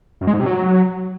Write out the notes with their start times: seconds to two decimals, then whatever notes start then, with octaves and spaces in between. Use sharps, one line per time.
0.21 F#2
0.27 G#3
0.34 G#2
0.40 C3
0.46 F#3